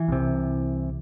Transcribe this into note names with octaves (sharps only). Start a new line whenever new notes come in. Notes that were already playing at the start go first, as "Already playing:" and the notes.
Already playing: E3
C2 C3